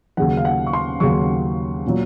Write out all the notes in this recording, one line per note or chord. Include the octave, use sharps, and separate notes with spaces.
D#2 C#3 F#3 F#5
F5
F#5
C#6
C6
D#2 C#3 F#3 C#6
A#2 F#3